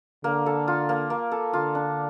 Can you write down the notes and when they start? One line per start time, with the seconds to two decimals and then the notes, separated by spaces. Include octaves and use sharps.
0.24 D3 A#3
0.46 A4
0.68 F4
0.89 A#3
1.10 A#3
1.32 A4
1.53 D3 F4
1.75 D4